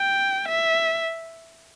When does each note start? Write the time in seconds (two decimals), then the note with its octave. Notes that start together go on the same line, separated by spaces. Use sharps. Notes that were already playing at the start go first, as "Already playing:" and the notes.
Already playing: G5
0.48 E5